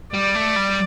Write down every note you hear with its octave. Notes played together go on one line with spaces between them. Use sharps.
G3 D5
A3
G3